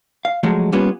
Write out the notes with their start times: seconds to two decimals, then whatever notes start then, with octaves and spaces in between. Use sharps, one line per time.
0.25 F5
0.43 F3 F#3 G#3 A3
0.72 G3 A#3 B3 C#4 F4